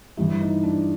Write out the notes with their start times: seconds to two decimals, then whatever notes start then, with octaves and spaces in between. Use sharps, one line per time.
0.17 G2 E3 E4
0.41 D#4
0.63 D4